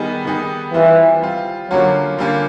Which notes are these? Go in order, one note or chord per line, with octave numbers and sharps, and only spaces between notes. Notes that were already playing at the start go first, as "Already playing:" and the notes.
Already playing: D#3 G3 B3 D#4 G#4
D#3 G3 B3 D#4 G#4
E3 G3 C4 F4
G3 C4 F4
D3 F#3 G3 A#3 C#4 F4
D3 G3 A#3 C#4 F4